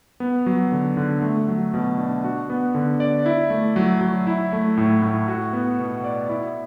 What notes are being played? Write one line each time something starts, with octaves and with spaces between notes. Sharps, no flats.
B3
F#3
D3
D3
A3
F#3
B2
D4
F#4
B3
D3
D5
E4
A3
F#3
F#3
E4
A3
A2
A2
F#4
B3
B2
D5
E4